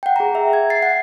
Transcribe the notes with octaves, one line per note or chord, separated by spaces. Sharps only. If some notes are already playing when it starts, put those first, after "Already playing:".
F#5 G5
G#4 A#5
E5
G#6
A6 C7
F#5